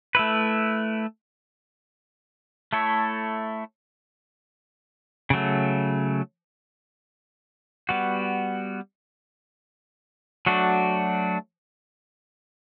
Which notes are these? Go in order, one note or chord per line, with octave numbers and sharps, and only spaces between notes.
A3 E4 B4
A3 E4 A4 C#5
C#3 F#3 A3
G3 B3 F#4
F#3 A3 D4 F#4